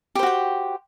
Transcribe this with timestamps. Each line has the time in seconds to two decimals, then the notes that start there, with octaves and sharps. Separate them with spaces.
0.15 G4
0.19 C5
0.23 F#4
0.26 G5